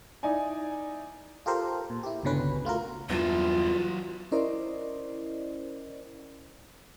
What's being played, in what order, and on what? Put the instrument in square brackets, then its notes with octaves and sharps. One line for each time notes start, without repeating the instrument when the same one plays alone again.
[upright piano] D#4 E4 D5 G#5
[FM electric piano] F4 G4 A4 A#4 C5
A#2
E4 G4
G1 C#2 B2 D3 C#4 B4
A3 F4 F#4 A#4
[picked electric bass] E2 G2 [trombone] E3 [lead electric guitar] F#3 A5 [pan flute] F4
[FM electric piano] C#4 E4 A#4 C5 D5 D#5